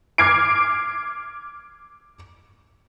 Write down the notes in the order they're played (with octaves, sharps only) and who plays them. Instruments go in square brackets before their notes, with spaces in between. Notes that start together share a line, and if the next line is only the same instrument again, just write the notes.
[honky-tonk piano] D6 F6 G#6 C7 D7